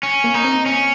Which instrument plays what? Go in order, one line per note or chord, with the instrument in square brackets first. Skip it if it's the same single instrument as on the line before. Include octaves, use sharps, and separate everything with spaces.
[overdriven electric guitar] C#4
[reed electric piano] A#3
[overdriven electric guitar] D#4
[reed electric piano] C4
[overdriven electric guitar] C#4